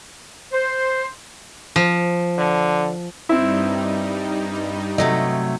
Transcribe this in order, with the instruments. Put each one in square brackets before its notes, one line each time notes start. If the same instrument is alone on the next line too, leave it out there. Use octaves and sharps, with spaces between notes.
[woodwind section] C5
[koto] F3
[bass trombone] D3
[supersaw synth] G2 G3 D#4 [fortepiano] C4 E4
[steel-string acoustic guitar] C3 F#3 A3 [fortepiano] D#5